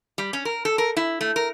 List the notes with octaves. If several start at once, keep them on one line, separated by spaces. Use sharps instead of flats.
G3
C#4
A#4
A4
A#4
E4
A3
A#4